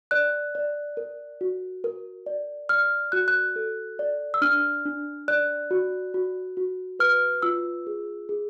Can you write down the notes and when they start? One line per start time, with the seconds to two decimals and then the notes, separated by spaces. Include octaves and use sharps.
0.11 D5 F#6
0.55 D5
0.97 A#4
1.41 F#4
1.84 A#4
2.26 D5
2.69 D5 F6
3.12 F#4 F#6
3.28 F#6
3.56 A4
3.99 D5
4.34 E6
4.42 D4 F6
4.85 D4
5.28 D5 F#6
5.71 F#4
6.14 F#4
6.57 F#4
6.99 B4 F6
7.42 F4 E6
7.87 G#4
8.29 G#4